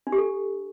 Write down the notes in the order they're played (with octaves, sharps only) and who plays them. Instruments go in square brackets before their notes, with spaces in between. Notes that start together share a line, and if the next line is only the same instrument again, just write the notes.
[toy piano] D4
G4
A4